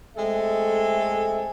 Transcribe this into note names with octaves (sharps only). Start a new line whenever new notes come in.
G#3 A3 C4 A4 E5